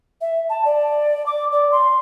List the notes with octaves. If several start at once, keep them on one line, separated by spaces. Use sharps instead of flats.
E5
A5
D5
D6
D5
C6